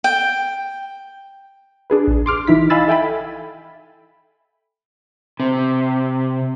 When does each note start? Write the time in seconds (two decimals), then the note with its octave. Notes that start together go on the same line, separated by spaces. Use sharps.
0.04 G5
1.90 D4 G#4 B4
2.08 A#1
2.26 C6 D6 F6
2.47 E3 D#4 E4 B6
2.70 D#5 F5 G#5 B5 E6 A6
2.88 A4 E5 G5 G#5 B5
5.40 C3